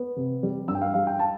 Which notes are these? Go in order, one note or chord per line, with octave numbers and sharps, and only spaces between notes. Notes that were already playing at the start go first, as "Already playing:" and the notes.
Already playing: B3
C3
G3
G2 E6
G5
F5
G3 F5
G5
A5